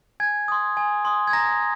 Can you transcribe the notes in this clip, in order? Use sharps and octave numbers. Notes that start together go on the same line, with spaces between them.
G#5 G#6
C6 D#6
G#5
C6 D#6
G#6
A#5 A#6